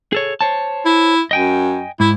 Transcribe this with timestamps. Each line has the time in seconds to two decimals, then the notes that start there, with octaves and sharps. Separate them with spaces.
0.13 G#4 A4 C#5
0.41 C5 C#5 A5
0.85 E4
1.31 F#2 D#5 G5 G#5
2.00 G#2 E4